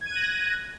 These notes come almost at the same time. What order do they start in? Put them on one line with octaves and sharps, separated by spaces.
G#6 D#7 F#6 A#6